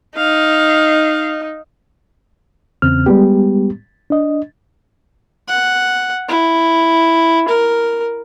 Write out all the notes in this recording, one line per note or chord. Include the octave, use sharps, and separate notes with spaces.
D#4 F5
E2 C#3 C4 F6
G3 G#3 B3 G4
D4 D#5
F#5
E4
A#4